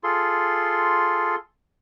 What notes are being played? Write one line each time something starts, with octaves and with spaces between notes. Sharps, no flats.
F4 G#4 A4 C6